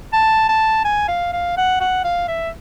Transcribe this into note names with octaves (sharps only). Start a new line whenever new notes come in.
A5
A5
G#5
F5
F5
F#5
F#5
F5
E5